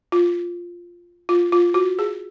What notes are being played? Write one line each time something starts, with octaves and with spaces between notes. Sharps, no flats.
F4
F4
F4
F#4
G#4